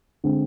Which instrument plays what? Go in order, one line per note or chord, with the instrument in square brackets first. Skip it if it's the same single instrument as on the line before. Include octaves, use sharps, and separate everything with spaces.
[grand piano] D3 G#3 C4